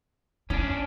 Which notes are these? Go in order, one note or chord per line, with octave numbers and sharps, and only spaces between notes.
C#4 D4 E4